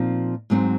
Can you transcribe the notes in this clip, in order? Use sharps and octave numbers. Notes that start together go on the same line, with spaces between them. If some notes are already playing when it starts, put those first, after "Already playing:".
Already playing: A#2 F3 C4 D#4
G#2 F#3 C4 D#4